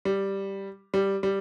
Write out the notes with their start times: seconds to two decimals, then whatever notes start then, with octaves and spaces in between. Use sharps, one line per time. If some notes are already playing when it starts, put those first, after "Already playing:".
0.05 G3
0.94 G3
1.23 G3